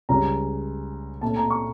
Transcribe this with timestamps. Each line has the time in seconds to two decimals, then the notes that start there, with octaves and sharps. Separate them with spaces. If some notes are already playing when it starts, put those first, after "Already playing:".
0.09 C#2 C#3 G3 C#4 A#5
1.21 A#2 A3 C#4 A5
1.37 A#5
1.50 C#6